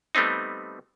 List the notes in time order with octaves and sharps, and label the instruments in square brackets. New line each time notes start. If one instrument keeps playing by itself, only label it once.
[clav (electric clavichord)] G3 A3 B3 C4 D#4